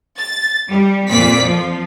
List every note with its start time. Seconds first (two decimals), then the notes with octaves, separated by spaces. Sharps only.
0.17 A6
0.69 G3
1.08 F2 A#2 D5 B6
1.44 F3